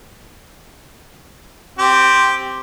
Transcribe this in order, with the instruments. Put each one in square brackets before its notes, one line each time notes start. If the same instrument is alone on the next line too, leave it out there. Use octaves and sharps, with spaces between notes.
[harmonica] C4 G4